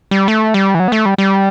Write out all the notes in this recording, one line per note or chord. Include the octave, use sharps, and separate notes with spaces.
G3
A3
G3
E3
F#3
B3
A3
G3
G3